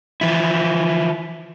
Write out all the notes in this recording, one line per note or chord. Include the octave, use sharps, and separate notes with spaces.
E3 F3 E4